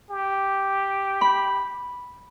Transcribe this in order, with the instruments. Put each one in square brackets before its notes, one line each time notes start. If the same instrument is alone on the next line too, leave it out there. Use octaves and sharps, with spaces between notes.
[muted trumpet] G4
[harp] B5